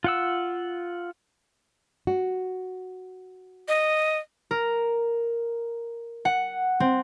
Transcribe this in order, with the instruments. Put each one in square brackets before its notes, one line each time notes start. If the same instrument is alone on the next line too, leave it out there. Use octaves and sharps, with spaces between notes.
[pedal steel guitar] F4 F#5 E6
[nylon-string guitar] F#4
[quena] D#5
[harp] A#4
F#5
C4